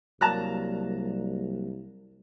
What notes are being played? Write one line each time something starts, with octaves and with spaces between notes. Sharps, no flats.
C2 F#3 G3 A#3 A5 A#5 F#6